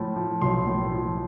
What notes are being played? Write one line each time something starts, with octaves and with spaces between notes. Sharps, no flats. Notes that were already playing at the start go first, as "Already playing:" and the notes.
Already playing: A2 F3
F3
B1 C6
A2
F3